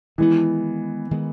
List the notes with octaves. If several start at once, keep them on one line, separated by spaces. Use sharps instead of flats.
D#3 E3 G#3 B3
D#3 G#3 B3